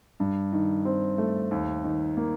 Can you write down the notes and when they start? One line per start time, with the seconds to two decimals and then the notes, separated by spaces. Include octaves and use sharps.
0.20 G2
0.53 D#3
0.85 C4
1.18 A3
1.51 D#2
1.84 D#3
2.17 A#3